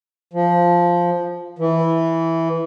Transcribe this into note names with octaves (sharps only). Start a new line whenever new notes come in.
F3
E3